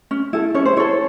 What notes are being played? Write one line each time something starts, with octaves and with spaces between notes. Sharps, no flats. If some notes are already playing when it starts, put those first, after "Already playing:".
C#4
E4 A4
C#4 C#5
C5
E4 A4 C#5